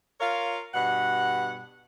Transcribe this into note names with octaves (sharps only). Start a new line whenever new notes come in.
F4 A#4 C#5 F5
G2 B2 F#5